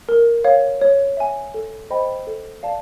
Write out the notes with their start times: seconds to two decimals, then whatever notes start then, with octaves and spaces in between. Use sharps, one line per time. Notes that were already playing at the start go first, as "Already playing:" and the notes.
0.09 A#4
0.44 C#5 F5
0.81 C#5
1.17 E5 G#5
1.54 A4
1.91 C5 D#5 G5 B5
2.27 A4
2.63 D5 F5 A5